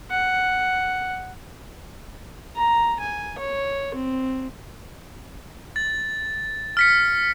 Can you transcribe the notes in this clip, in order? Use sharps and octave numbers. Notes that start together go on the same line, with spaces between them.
F#5
A#5
G#5
C#5
C4
A6
F6 B6 C#7